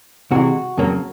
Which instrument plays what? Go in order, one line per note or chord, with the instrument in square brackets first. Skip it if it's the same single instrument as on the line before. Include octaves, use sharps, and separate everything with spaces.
[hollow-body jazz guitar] C3 E3 G#3 F#4
F2 C#3 F#3 A#3